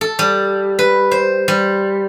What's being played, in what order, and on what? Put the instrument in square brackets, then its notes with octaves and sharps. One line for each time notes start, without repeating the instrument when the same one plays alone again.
[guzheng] A4
G3
B4
C5
G3